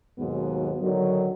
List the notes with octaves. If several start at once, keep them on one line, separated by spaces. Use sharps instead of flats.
D#2 G#2 B2 F#3 B3
D3 D#3 F#3